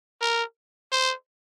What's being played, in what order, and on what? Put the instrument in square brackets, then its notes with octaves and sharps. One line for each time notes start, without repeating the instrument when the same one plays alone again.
[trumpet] A#4
C5